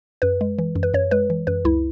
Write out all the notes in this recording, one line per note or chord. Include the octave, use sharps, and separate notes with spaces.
F#2 B4
G#3
E3
F#2
B4
F#2 C#5
G#3 B4
E3
F#2 B4
C#2 E4